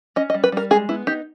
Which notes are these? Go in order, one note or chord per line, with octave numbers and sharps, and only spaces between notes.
C#4 D#5
D#5
G3
B4
G3 A#4
G#3 G#4
B3 E4
D#4 G4